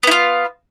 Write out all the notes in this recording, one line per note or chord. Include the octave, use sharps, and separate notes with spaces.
B3 E4 F4